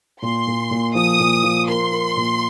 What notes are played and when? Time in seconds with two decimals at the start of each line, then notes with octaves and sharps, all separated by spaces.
0.22 A#2 C6
0.47 A#2
0.71 A#2
0.95 F3 D#6
1.20 A#2
1.44 F3
1.68 A#4 C6
1.92 A#4
2.16 A#2